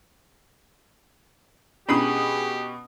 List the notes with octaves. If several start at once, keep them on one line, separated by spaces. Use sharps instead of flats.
B2 C#4 D4 E4 G4 G#4 B5 D#6